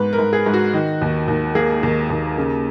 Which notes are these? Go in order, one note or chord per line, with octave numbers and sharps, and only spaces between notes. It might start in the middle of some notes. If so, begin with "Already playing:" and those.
Already playing: G#2 B3 B4
A#4
G#2
G#4
G#2
F#4
D#3
D#2
D#2
A#3 G#4
D#2
D#2
C#3